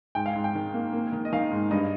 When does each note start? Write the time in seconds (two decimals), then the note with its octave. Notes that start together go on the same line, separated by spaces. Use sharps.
0.15 G#2 G5
0.26 F5
0.35 G#2
0.44 G5
0.55 D#3
0.74 A#3
0.93 A#3
1.12 D#3
1.25 D#5
1.32 D#3 F5
1.51 G#2
1.71 G2 D#5